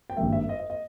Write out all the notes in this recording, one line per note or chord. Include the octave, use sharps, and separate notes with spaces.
G5
G#1 G2 G3 A#3 E5
E5
D#5
D#5
D#5